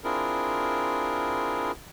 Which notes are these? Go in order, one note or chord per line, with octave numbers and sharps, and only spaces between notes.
C4 D4 E4 F4 G#4 A#4